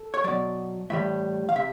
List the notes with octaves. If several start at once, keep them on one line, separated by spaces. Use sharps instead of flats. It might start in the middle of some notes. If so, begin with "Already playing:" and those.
Already playing: A4
C#5
B2 F#3 D5
A2 E3 G3 E5
F5
C3 E5